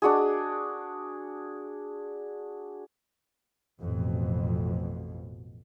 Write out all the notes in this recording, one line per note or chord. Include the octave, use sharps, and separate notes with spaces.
D4 F#4 G#4
A1 F2 B2